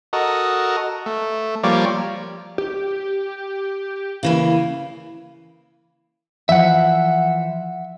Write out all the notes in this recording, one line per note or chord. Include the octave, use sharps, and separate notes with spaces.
F#4 A4 A#4 D#5
A3
F3 G3 A#3 C#5 D5
G4
C#3 E3 A#3
E3 F3 E5 F#5